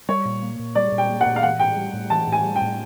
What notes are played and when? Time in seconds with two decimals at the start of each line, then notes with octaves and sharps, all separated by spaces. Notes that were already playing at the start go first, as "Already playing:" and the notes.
0.08 G3 C#5
0.25 A#2
0.42 A#3
0.59 A#2
0.75 G3 D5
0.92 A#2
0.98 G5
1.09 A#3
1.21 F#5
1.26 A#2
1.36 F5
1.43 E3 F#5
1.59 A2 G5
1.76 G3
1.93 A2
2.10 E3 A5
2.27 A2
2.32 G#5
2.44 G3
2.56 G5
2.61 A2